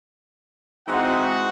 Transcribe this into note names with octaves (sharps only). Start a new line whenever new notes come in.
E3 G#3 C4 D#4 F#4 F#5